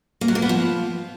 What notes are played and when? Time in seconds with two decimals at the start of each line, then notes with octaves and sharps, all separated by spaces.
0.21 A#3
0.28 F#3
0.35 A#3
0.42 B3
0.49 F3